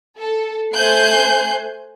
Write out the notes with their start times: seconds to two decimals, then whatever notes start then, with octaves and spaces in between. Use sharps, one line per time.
0.18 A4
0.74 A3 C5 G#5 F#6 G6 C7